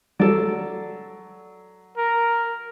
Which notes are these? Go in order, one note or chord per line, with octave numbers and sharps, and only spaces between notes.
F#3 A4 D5
A#4